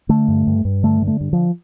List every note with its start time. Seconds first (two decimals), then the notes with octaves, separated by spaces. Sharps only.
0.09 D3 A3
0.28 G2
0.47 G2
0.65 G2
0.83 D3 A3
1.01 D3
1.07 A3
1.21 G2
1.33 F3